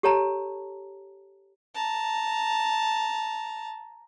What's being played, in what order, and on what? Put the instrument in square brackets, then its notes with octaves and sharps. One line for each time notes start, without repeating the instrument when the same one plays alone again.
[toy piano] G4 A4 C#5 A5 A#5
[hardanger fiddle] A5 A#5